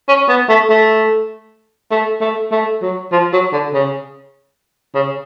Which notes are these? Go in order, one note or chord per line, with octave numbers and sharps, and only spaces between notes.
C#4
B3
A3
A3
A3
A3
A3
F#3
F3
F#3
D3
C#3
C#3